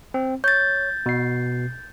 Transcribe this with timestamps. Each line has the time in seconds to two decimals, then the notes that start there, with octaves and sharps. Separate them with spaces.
0.14 C4
0.44 C#5 G6 A6
1.06 B2 C7